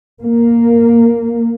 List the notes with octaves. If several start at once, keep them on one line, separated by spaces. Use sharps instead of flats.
A#3